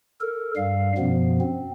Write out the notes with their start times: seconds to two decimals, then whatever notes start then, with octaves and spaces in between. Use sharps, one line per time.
0.21 A4 A#4
0.56 G2 G3 F5
0.98 F#2 B2 F3 B3
1.41 C4